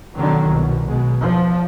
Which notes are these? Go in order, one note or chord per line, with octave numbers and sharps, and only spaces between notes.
B2 D3 D#3 F#3
C2 B2
B1 B2 G#3
E2 F3